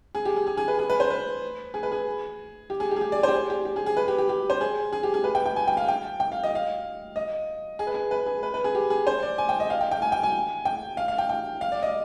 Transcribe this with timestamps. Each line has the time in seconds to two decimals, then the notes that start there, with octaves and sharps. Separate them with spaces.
0.15 G#4
0.25 G4
0.36 G#4
0.47 G#4
0.57 G#4
0.68 B4
0.79 G#4
0.90 B4
1.00 C5
1.10 B4
1.74 G#4
1.83 B4
1.92 G#4
2.70 G4
2.80 G#4
2.91 G4
2.96 G#4
3.01 G4
3.12 D5
3.23 G4 C5
3.34 G#4
3.50 G4
3.65 G4
3.76 G#4
3.86 G#4
3.97 B4
4.08 G4
4.18 G4
4.29 G4
4.50 C5
4.61 G#4
4.93 G#4
5.03 G4
5.14 G#4
5.24 B4
5.35 G5
5.46 G5
5.56 G#5
5.68 G5
5.77 F5
5.88 G5
6.20 G5
6.32 F5
6.43 D#5
6.55 F5
7.16 D#5
7.79 G#4
7.87 B4
7.94 G#4
8.11 B4
8.26 G#4
8.43 B4
8.54 B4
8.64 G#4
8.75 G4
8.90 G#4
9.07 C5
9.23 D5
9.38 G#5
9.49 G5
9.60 D#5
9.70 F5
9.81 G5
9.91 G5
10.02 G#5
10.12 G5
10.23 G#5
10.65 G5
10.97 F5
11.08 F5
11.18 G5
11.29 G5
11.61 F5
11.72 D5
11.83 D#5